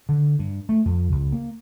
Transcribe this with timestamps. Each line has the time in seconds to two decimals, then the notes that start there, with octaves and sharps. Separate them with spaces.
0.09 D3
0.39 G2
0.69 A3
0.86 F2
1.12 C#2
1.32 A#3